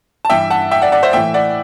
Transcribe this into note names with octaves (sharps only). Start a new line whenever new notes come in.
A5
G2 E3 E5 G5
F#5 A5
E5 G5
D5 F#5
D5 F#5
C5 E5
A2 E3 E5 G5
D5 F#5